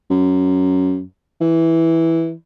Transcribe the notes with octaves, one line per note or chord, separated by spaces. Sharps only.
F#2
E3